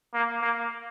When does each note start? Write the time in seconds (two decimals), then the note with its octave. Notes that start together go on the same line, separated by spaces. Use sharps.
0.14 A#3
0.42 A#3